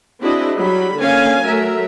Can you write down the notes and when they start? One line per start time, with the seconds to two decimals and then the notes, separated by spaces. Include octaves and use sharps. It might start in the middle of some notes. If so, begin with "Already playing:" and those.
0.20 C4 D4 E4 F#4 G#4 D#5
0.58 F#3 G3 B5
0.98 D3 A#3 C#4 F5 G#5
1.45 F#3 A3 A#4 E5